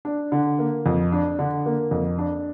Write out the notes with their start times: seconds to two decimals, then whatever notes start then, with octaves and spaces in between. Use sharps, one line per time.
0.05 D4
0.32 D3
0.59 A#3
0.86 F2
1.12 D4
1.39 D3
1.66 A#3
1.91 F2
2.18 D4